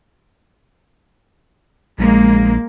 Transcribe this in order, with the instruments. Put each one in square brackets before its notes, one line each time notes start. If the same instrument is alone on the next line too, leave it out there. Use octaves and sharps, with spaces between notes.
[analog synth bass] A#1 [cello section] G#3 A#3